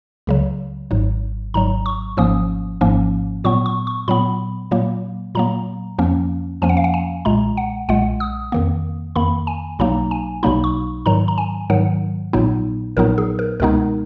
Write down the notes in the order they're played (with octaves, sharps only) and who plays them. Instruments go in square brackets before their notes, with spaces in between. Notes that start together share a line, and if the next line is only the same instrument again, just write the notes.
[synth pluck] C#2 C#3 F#3
G#1 G#2 F#3
G#1 G#2 F#3 A#5
C#6
G#1 G#2 F3 A#3 C#4 D#6
G#1 G#2 F3 A#3 C#4
A#2 F#3 B3 C#6
C#6
C#6
A#2 F#3 B3 B5
A#2 F#3 A#3
A#2 F#3 A#3 A#5
F2 F3 A#3 C#4
F2 F3 A#3 C#4 G#5
F#5
F5
F#5
G#5
B1 A#2 G#3 A#5
F#5
B1 A#2 G#3 F#5
D#6
F2 D#3 A#3
F2 D#3 A#3 B5
G#5
B1 B2 F#3 A#3 D#4 A#5
G#5
B1 B2 F#3 A#3 D#4 B5
C#6
G#2 D#3 F#3 A#5
A#5
G#5
G#2 D#3 F#3 F#5
A#1 A#2 F#3 B3 D#4
A#1 A#2 F#3 B3 D#4 A#4
G#4
A#4
C#2 B2 G#3 B3 D#4 A#4